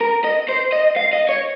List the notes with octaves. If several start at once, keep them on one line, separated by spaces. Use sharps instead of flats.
A#4
D#5
C5
D#5
F5
D#5
C#5